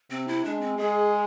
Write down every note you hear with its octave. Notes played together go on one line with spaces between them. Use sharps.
C3 C4
E4
G#3 D4
C4
G#3 G#4